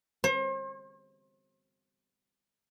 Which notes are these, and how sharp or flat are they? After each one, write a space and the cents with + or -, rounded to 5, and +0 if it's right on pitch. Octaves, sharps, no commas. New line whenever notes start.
C5 +40